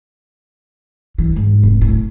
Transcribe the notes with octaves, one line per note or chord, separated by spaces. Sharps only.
E3
G#2
F1
A2